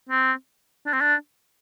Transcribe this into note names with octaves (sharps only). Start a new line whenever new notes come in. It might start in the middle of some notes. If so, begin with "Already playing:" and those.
C4
D4
C4
D4